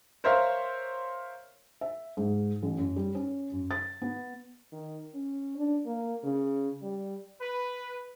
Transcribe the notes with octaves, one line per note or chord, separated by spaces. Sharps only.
A#4 C5 C#5 E5 F5
E5
G#2
A1
F#2
G3
C#4
F#2
A6
B3
D#3
C#4
D4
A#3
C#3
G3
B4